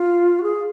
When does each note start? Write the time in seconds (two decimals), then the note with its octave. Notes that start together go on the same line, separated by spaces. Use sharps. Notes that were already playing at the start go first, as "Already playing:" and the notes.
Already playing: F4
0.38 F#4
0.43 G#4